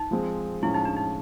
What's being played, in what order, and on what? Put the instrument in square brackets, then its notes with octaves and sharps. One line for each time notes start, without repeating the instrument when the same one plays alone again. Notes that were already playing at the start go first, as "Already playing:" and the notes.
Already playing: [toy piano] D#4
[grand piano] F3 G#3 C4
[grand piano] A2 F3 G#3 C#4 [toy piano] E4
[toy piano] D#4
D4
D#4